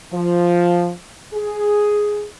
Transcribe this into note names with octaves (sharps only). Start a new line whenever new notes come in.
F3
G#4